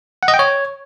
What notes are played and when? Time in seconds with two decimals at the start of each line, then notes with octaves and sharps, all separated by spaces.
0.23 F#5
0.28 D#5
0.34 G5
0.39 C#5